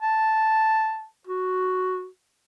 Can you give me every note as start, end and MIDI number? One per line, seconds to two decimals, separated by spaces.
0.02 1.06 81
1.27 2.07 66